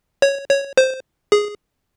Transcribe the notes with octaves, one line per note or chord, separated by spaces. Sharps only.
C#5
C#5
C5
G#4